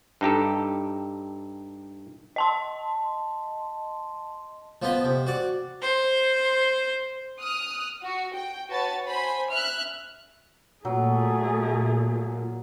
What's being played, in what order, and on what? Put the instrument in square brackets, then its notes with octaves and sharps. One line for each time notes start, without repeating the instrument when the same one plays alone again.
[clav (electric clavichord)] G2 D#4 G4 A4
[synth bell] D#5 A5 C6
[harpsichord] F3 B3 D#5
C3
F#4 D5
[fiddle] C5
[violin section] D#6 F6 F#6
F#4
G5
F#4 B4 C#5 A5 A6
C5 G#5 B5
E5 F6 F#6
[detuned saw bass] A#2 [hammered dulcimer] F#3 [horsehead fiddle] A3 G#4